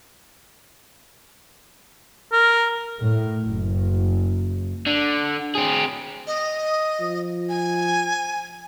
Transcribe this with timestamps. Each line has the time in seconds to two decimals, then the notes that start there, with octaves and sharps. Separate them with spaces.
2.32 A#4
3.03 A2
3.44 F#1
4.87 D3
5.55 C4 G#4
6.27 D#5
7.00 F3
7.49 G#5